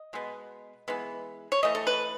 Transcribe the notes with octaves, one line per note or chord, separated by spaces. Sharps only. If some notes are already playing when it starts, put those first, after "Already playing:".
Already playing: D#5
B2 G#3 B3
E3 G#3 B3
C#5
E3 A3 D#5
A4
B4